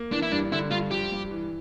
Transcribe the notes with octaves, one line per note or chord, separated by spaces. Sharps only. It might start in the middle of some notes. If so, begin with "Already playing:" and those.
Already playing: A#3
E3 D4
E4
G2 D4
D3 E4
G2 F4
F3 G4
G2
E3